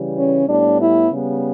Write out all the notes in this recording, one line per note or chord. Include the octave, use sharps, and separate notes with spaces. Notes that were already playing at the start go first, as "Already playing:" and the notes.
Already playing: C#3 E3 G3
C#4
A2 G3 B3 D4
E4
C#3 G3 B3